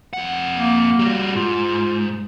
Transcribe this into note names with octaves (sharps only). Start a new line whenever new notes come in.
F2 F#5
A#3
G3 F#4
G#2 F4